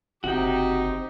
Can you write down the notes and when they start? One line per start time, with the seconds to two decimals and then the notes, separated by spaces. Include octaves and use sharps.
0.24 F#1 C3 D#4 F#4 G4 G5